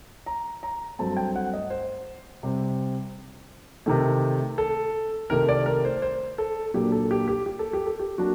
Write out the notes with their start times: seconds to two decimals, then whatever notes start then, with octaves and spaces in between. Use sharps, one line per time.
0.26 A#5
0.63 A#5
0.99 G2 F#3 A3 C4 A5
1.17 G5
1.36 F#5
1.54 D#5
1.70 C5
2.43 C3 G3 C4
3.86 C3 D#3 A3
4.58 A4
5.30 C3 D#3 A3 A#4
5.49 D5
5.66 A#4
5.85 C5
6.02 C5
6.38 A4
6.74 A#2 F#3 A#3 D4 G4
6.92 A4
7.11 G4
7.28 G4
7.46 G4
7.59 A4
7.73 G4
7.86 A4
7.99 G4
8.18 F#3 A#3 D4 F#4